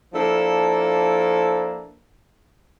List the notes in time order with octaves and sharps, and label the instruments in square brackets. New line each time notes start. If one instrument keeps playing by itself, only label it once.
[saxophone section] F3 A#3 D4 E4 A4